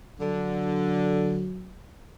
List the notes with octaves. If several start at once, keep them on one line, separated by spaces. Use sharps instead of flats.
D3 F#3